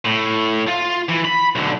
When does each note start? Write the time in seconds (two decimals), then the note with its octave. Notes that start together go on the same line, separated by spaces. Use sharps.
0.06 A2
0.68 F4
1.09 E3
1.25 B5
1.55 B1 D3